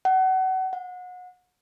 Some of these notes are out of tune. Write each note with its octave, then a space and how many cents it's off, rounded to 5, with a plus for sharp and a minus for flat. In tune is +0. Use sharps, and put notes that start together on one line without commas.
F#5 +30
F#5 -30